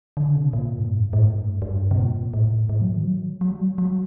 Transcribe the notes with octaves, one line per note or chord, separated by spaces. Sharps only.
D3
C3
A#2
G2
A2
G2
A2
G2
G2
C3
A#2
A2
A2
F#3
D#3
F#3
F#3
G3
F#3
F#3